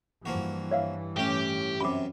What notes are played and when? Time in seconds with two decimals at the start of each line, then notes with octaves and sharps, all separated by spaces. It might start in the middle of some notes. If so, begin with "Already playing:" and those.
0.26 G2 E3 F3 A#3 F#4
0.71 C#5 E5 F5
1.16 A2 C#4 G4
1.81 F#2 C3 B5 D6